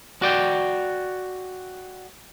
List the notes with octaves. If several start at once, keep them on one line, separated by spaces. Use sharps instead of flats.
F#4 D5 G5